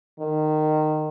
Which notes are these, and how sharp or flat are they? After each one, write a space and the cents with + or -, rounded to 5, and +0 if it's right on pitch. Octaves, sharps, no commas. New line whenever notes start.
D#3 -20